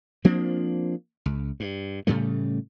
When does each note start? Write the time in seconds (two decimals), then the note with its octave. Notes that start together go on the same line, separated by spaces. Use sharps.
0.25 F3 A#3 C4 D4
1.26 C#2
1.60 G2
2.07 A2 C#3 G3 A3